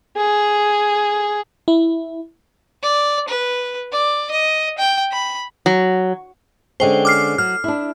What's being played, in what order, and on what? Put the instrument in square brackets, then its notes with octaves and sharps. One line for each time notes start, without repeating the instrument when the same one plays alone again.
[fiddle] G#4
[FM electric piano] E4
[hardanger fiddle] D5
B4
D5
D#5
G5
B5
[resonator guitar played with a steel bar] F#3
[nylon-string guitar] D3 G#3 C#4 [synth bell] C5 G5
[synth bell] D6 F6 C7
[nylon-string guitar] F#3 [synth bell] F6
[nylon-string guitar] D4 E4